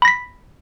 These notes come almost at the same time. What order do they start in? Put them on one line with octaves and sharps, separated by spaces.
B5 A#6 B6